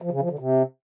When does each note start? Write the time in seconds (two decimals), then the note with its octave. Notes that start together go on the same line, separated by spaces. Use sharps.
0.02 F3
0.11 C#3
0.20 F3
0.30 D3
0.39 C3